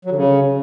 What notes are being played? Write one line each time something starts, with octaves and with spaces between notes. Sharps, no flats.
F#3
D3
C#3